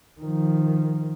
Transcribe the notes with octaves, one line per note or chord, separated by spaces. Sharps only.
D#3 F3